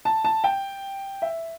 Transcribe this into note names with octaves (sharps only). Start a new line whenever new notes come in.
A5
A5
G5
E5